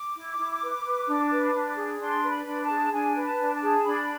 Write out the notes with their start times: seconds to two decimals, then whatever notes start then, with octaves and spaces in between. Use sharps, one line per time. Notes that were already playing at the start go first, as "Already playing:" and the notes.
Already playing: D6
0.16 E4
0.38 E4
0.62 B4
0.85 B4
1.07 D4
1.31 B4
1.54 D4
1.77 G#4
2.00 D4 C6
2.23 B4
2.30 B5
2.46 D4
2.62 A5
2.70 G#4
2.92 D4 G#5
3.15 B4
3.24 A5
3.39 D4
3.54 A5
3.62 G#4
3.84 D4 B5